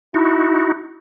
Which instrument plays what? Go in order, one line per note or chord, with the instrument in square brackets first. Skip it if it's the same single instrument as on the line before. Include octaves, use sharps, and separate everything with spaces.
[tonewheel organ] D#4 F#4 [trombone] E4